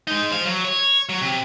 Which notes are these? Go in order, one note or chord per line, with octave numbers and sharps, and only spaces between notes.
G#3 D#4
C5 F5
F#3
C#5
F#3
C3